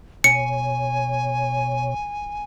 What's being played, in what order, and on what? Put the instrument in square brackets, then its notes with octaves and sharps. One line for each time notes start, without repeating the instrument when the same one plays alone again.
[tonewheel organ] B2 C#5 [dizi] G#5 [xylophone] C#7